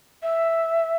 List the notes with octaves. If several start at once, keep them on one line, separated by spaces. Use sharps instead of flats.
E5